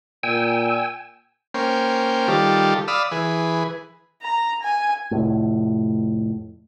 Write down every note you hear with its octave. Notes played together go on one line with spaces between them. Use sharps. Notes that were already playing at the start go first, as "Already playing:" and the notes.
A#2 G5 G#5 E6
A#3 C#4 C5 G5
D#3 G3 F4 G4 A4
D5 F5 B5 D#6 E6
E3 G#4 B4
A#5
G#5
F1 A2